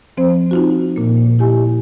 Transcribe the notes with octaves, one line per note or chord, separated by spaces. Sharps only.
F3 C4 C5
D#4 F4 F#4
A#2 A#3
E4 G4 G#5